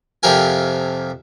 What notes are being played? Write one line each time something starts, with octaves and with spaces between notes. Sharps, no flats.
F2 C3 F3 G4 A#4 G#5